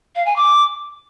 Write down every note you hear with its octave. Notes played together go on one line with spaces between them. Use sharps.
F5
G#5
D6